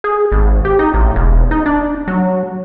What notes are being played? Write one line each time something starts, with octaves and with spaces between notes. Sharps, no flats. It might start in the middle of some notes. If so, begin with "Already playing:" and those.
G#4
G#1
G4
D#4
A1
E1
D#4
D4
F#3